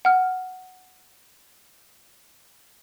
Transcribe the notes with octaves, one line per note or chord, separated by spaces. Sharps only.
F#5 F6